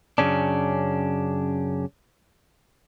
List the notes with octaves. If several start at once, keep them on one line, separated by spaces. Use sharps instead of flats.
F#2 C#3 C#4 D4